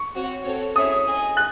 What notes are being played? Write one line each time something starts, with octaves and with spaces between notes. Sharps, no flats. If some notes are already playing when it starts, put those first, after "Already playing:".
Already playing: C#6
C4 F#4 C#5
C4 F#4 A4 C#5
C#4 E4 G#4 C#5 E5 D#6
G#4 D#5 G#5
F#6